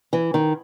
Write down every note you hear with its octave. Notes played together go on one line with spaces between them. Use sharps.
E3
D#3